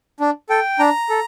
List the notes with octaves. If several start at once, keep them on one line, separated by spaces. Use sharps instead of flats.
D4
A4 G5
D4 A#5
A4